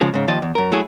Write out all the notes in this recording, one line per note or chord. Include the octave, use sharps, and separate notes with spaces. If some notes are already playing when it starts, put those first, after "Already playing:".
C#3 F3 G#3
G#2 C#3
D#2 F3 D5 D#5
E2
F#2 A#4
F#3 A3 E4 G#4